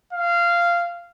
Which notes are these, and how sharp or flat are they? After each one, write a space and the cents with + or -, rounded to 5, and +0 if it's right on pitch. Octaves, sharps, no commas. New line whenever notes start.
F5 -15